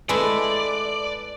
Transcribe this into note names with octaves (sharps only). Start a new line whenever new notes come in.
G#3 A3 E4 A4 B4 D5